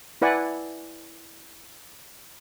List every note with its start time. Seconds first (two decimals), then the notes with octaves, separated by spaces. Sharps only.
0.22 E4 B4 D5 F#5 G#5